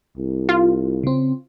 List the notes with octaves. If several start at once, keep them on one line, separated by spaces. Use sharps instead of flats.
C2
F4
C#3 C4